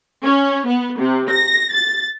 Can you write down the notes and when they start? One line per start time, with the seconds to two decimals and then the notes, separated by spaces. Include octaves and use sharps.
0.24 C#4
0.68 B3
0.98 C3
1.30 A#6
1.72 A6